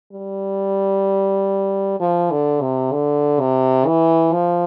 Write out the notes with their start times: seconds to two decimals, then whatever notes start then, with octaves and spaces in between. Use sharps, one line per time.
0.13 G3
2.00 F3
2.31 D3
2.61 C3
2.92 D3
3.40 C3
3.86 E3
4.33 F3